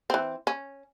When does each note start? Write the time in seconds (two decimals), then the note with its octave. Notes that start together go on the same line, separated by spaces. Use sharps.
0.10 E3 C4
0.47 C#4